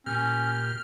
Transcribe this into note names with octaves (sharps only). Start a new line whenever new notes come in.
A#2 C#4 G4 F6